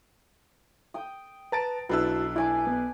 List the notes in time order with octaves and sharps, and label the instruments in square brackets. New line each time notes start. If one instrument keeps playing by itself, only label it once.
[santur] G5 D#6
[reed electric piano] B4 A5 [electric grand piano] A#5 A6 D7
[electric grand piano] B1 D4 E6 [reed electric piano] E4 F#4 [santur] B4 A5
[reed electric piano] E4 [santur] D5 G#5 D6
[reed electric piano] B3